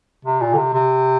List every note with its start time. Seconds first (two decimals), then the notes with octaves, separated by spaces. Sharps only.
0.25 C3
0.41 A#2
0.54 D3
0.57 C3
0.73 C3